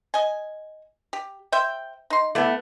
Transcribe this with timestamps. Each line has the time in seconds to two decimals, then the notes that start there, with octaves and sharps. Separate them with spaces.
0.14 D#5 G#5
1.13 G4
1.52 C5 E5 G5
2.10 D#4 C6
2.35 A3 B3 E4 D5